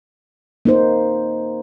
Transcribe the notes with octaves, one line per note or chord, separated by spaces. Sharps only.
A#3 D#4 C5